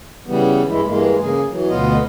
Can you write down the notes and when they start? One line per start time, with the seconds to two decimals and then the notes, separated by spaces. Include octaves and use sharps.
0.27 C#3 E3 G3 B3
0.68 G2 E3 G#3 E4
0.86 G2 E3 G#3 A#3
1.20 C#3 A#3 G#4
1.50 E3 F#3
1.69 D2 B2 B3 F4 D#5